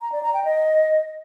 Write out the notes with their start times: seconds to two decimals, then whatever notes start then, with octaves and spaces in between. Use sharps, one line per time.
0.02 A#5
0.12 D5
0.23 A#5
0.34 G5
0.44 D#5